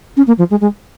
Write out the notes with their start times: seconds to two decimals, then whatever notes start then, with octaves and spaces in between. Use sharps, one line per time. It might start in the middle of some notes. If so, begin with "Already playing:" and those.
0.17 C#4
0.27 A#3
0.38 F3
0.51 G#3
0.61 G#3